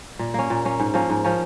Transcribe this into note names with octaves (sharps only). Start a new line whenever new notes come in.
A#2
A#3 C#4
A#2
A#3 C#4
G#2
F3 A#3 C#4
G#2
F3 A#3 C#4